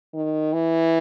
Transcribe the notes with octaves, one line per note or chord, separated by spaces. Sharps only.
D#3
E3